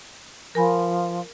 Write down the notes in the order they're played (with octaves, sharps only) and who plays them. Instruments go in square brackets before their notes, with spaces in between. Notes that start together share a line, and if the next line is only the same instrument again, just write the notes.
[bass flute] F3 [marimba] A#4 G#5 B5